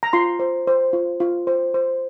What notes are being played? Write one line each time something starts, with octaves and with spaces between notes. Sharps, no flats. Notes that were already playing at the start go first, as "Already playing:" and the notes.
A#5
F4 C6
C5
C5
F4
F4
C5
C5